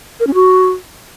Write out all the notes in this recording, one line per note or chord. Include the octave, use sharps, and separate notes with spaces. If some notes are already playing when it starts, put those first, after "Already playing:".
A#4
C#4
F#4